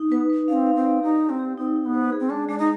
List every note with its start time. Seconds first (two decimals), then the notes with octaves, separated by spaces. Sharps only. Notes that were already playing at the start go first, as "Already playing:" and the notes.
Already playing: D#4
0.09 B3 B4
0.30 B4
0.48 D4 F5
0.53 C4
0.66 F5
0.75 C4
0.85 D5
1.03 D#4 G4
1.21 G4
1.30 C4
1.39 G4
1.57 C4 D#4
1.76 D#4
1.85 B3
1.94 C5
2.12 G#4
2.20 C4
2.30 G#3 D4
2.48 G#3 D4
2.58 D#4